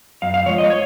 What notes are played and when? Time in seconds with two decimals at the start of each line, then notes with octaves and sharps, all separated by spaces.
0.22 F#2 F5
0.34 F5
0.46 F3 G#3 C#5
0.58 D#5
0.70 C#5